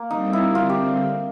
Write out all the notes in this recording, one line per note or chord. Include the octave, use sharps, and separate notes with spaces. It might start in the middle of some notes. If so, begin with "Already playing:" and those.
Already playing: A#3
D3 G3 C4 D#4
E4
F4
G4